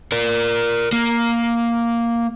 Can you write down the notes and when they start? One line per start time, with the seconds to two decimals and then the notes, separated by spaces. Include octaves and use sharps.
0.12 A#4 D5
0.93 A#3